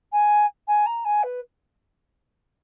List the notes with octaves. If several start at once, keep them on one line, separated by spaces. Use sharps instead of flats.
G#5
G#5
A#5
G#5
B4